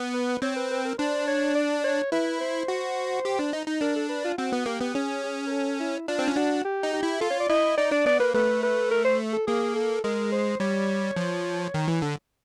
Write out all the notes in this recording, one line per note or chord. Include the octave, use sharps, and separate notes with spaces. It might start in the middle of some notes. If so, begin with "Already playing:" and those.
Already playing: B3
B4
C4 C#5
B4
B4
A#4
D4 C5
C#5
D5
C#5
E4 B4
C5
F#4
G4
D4
D#4
D#4
D4 A#4
A4
B4
F4
C4 F#4
B3
A#3 G4
B3
C#4 G#4
G#4
A#4
A4
E4
D4 F4
C4
C#4
D4 F#4
G4
D#4
G4
E4
F4 A4
C#5
D5
E4 D#5
D#4 D5
D4 D5
B3 D5
A#3 B4
A3 B4
B4
A#4
C5
A4
A#3 G#4
A4
G#3 A#4
C5
G3 C#5
F3
D#3
E3
D3